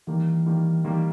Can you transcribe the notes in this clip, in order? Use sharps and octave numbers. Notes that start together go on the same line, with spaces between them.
D#3 E3 G3 A#3
D#3 G3 A#3
D#3 E3 G3 A#3